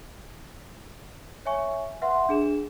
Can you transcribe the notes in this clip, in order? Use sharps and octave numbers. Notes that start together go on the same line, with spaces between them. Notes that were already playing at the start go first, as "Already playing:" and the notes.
C#5 E5 G#5 C#6
B4 E5 F#5 C6
D4 G#4 E7